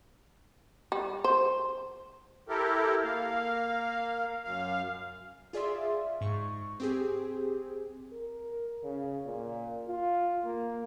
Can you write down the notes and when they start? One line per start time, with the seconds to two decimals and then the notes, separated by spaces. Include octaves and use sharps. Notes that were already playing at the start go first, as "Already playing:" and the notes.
0.92 G3
1.24 C5
2.49 E4 G4 A4 A#4
3.04 A#3 F5
4.44 F#2 F5
5.53 F4 G#4 D5 E5 C6
6.21 G#2 C#6
6.80 C4 G4 G#4
8.13 A#4
8.84 C#3
9.25 A#2
9.88 F4
10.45 A#3